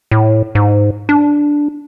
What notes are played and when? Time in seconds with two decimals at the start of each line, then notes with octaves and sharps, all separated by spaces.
0.11 A2
0.55 G#2
1.09 D4